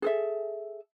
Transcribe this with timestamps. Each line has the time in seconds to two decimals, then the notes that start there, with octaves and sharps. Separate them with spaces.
0.02 G#4 A4 E5